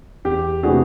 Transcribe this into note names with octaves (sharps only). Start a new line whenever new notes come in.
E2 G4
C3 E3 A3 D4 F#4 G#4